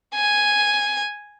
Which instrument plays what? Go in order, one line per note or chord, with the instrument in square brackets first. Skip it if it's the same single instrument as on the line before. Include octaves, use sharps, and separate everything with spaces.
[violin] G#5